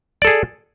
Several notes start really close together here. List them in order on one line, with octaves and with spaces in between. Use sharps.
D5 A4 G#4